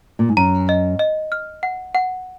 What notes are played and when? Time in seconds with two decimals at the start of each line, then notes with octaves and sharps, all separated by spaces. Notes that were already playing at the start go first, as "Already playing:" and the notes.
0.19 A#2
0.29 G#2
0.37 F#2 A#5
0.69 D#5
0.99 D#5
1.32 F6
1.63 F#5
1.95 F#5